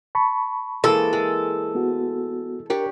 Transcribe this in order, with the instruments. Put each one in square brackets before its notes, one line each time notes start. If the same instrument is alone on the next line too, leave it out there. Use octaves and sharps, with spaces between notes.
[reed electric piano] A5 B5 C#6
[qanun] E3 G#3 A#3 [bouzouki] A4
[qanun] G#3
[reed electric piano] B3 F#4
[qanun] D4 G4 C#5 [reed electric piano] A#4